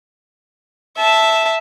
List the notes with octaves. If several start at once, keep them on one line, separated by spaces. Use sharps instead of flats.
E5 A5